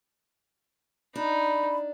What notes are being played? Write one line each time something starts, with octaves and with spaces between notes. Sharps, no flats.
D4 D#4 B5